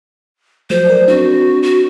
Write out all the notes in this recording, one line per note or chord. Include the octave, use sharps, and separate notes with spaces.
F3 F#3 A3 C5
A#4 D5
C4 D4 F#4
F#4